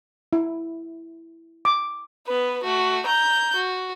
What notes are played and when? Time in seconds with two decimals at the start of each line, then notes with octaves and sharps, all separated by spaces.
0.33 E4
1.65 D6
2.28 B3 B4
2.64 A3 F#4
3.07 A#5 G6
3.56 F#4